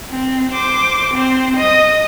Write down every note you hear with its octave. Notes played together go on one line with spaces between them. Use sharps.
C4
C5 D6
C4 C5
D#5 D#6